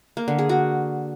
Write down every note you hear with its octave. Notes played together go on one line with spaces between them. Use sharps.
A#3
D3
G#4
F#4